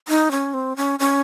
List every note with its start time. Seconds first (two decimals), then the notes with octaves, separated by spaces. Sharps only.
0.08 D#4
0.31 C#4
0.54 C4
0.76 C#4
0.99 C#4